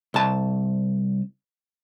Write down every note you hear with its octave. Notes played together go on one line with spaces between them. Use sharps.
C2 A5